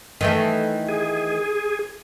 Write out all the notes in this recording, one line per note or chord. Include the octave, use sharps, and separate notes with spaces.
D#3 E3 A3
G#4